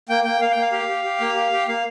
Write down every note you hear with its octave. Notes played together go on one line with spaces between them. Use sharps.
A#3 G5
A#3 G5
A#3 F5
A#3 G5
F5
G4 F5
G4
G4
A#3
G4
G4
A#3 F5